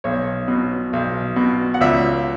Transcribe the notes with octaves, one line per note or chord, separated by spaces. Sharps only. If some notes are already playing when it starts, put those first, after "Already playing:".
B1 C#5
B2
B1
B2
F#5
C#2 E5